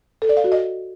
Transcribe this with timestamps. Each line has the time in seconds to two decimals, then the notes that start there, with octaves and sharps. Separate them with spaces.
0.22 A4
0.29 D5
0.37 F5
0.44 F#4
0.52 D#5